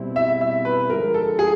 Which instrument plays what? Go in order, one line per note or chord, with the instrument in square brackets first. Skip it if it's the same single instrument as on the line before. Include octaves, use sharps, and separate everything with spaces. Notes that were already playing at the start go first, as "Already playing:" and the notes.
Already playing: [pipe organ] B2 G3 C4 E4
[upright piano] E5
E5
B4
[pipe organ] D3 F3 G#3 [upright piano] A#4
[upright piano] A4
G#4